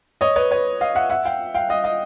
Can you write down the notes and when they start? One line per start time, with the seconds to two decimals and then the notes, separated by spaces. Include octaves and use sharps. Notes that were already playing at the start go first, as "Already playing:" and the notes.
0.21 C#5 D#5
0.36 B4 C#5
0.51 B4 C#5
0.81 D#5 F5
0.95 E5 F#5
1.10 E5 F#5
1.25 F5 G5
1.54 F5 G5
1.69 D#5 F5
1.84 D#5 F5